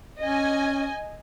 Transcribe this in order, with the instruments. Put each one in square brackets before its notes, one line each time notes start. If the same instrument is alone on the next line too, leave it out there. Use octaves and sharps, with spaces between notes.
[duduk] C#4 [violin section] D#5 G#5